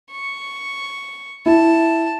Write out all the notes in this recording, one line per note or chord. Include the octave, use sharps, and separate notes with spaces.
C#6
E4 A5